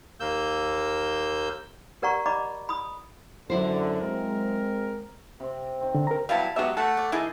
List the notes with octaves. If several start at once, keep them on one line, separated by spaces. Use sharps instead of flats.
D#2 A#3 E6 G6
G4 A#4 D5 F#5 A#5 C#6
D5 D#5 A#5 B5 D6
B5 D#6
F#2 D3 F#3 E4 C5
G#3 C4 A#4
C3 C4
D#3 C4
D3
A#4 A#5
F#3 G3 B3 E4 F5 A5 B5
F#3 G#3 B3 F#4 G4 E5
A3 F#4 A4 F#5
D5
E3 A#3 D#4 E4 G#4 A5